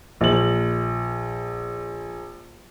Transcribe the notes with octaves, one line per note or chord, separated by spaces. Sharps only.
A#1 F#7